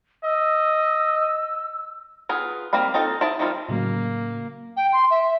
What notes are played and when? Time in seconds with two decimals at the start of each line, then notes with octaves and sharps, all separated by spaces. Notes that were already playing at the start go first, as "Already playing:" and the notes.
0.24 D#5 E6
2.29 B3 F4 G#4
2.73 G3 A#3 C4 F5 B5
2.94 C4 D#4 F4 A4
3.21 E4 G#4 C5 A5
3.39 D#3 F3 G3 C4 F4
3.69 A2 C#3 F#3 A#3
4.77 G5
4.93 C6
5.11 E5